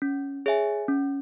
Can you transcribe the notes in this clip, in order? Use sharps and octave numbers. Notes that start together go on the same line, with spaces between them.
C#4
G#4 C#5 E5 G#5
C#4